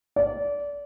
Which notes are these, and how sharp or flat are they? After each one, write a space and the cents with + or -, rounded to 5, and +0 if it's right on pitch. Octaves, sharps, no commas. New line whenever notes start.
D5 -25